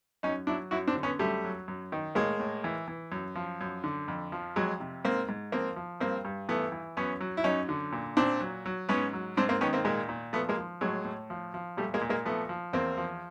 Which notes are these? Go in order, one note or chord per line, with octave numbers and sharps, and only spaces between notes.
F#2 C#4 D#4
F#3 D4 E4
F#2 E4 F#4
C4 D4
D3
B3 C#4
F#2 G3 A3
F#3
F#2
D#3
A2 G#3 A#3
A2
E3
E3
F#2
F3
F#2
D3
F2
F3
F2 F#3 G#3
C3
G#2 A#3 C4
G#2
F3 A#3 C4
F3
G2 A#3 C4
G2
E3 A3 B3
E3
F#2 B3 C#4
F#3
E4
F#2 C#4 D#4
D3
A#2
A#2 C4 D4
F#3
F#3
G#2 B3 C#4
F#3
G#2 C4 D4
A#3 C4
D#3 B3 C#4
A#3 C4
A#2 G#3 A#3
A#2
F3 A3 B3
G#3 A#3
F3
A2 F#3 G#3
A2
F3
F3
A#2 G3 A3
G#3 A#3
A#2
G#3 A#3
F3 A3 B3
F3
E2 A#3 C4
F3